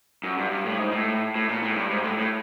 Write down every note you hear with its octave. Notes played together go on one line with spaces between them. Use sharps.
F#2
G2
G2
A2
G#2
A2
A2
A#2
A2
G#2
G2
G#2
A2
A2